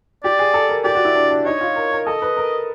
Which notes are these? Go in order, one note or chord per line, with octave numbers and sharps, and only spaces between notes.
G4 D5
G#4
A4
A#4
G4 D5
F#4
E4
D4
D4
D#4 C#5
F4
A#4
A#4
A4 D#5
B4
A#4